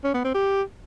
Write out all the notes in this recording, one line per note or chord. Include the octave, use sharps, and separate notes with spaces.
C#4
B3
C4
G4